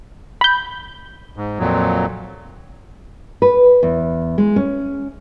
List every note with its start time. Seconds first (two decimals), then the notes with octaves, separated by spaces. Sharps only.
0.41 B5 G6
1.37 G#2
1.59 F2 A#2 F#3
3.42 B4
3.83 E2
4.38 G#3
4.56 C#4